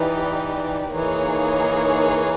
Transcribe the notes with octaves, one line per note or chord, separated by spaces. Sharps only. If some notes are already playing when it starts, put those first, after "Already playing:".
Already playing: E3 D#4 G4 B4 D5
E3 A#3 D#4 G#4 C#5